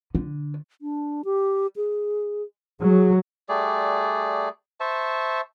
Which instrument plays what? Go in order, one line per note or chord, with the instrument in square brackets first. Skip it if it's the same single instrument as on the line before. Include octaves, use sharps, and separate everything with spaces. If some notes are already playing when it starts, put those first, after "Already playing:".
[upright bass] D3
[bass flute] D4
G4
G#4
[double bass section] F#3 [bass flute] G#4
[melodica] G3 A3 G#4 D5
C5 E5 A5 C#6